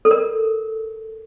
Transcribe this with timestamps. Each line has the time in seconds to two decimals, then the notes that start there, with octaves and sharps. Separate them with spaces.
0.05 A4
0.11 A#4